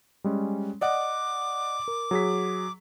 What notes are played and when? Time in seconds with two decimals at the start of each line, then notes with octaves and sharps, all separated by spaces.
0.24 G3 G#3 C#4
0.81 D5 D#5 F#5 D6
1.88 A#4
2.11 F#3 G#4 B6